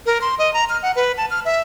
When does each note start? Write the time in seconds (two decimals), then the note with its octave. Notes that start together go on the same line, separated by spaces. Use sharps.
0.06 A#4
0.21 C6
0.39 D#5
0.54 A#5
0.69 F6
0.83 F#5
0.96 B4
1.17 A5
1.30 F6
1.45 E5